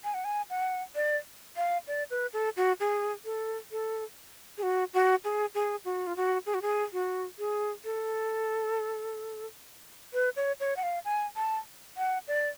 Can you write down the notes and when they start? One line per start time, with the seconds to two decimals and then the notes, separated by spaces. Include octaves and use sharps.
0.04 G#5
0.14 F#5
0.24 G#5
0.50 F#5
0.95 D5
1.56 F5
1.87 D5
2.10 B4
2.33 A4
2.57 F#4
2.80 G#4
3.25 A4
3.72 A4
4.58 G#4
4.63 F#4
4.94 F#4
5.24 G#4
5.55 G#4
5.85 F#4
6.07 F4
6.17 F#4
6.46 G#4
6.54 F#4
6.62 G#4
6.93 F#4
7.39 G#4
7.85 A4
10.14 B4
10.36 C#5
10.60 C#5
10.77 F#5
10.83 F5
11.05 G#5
11.36 A5
11.97 F#5
12.28 D5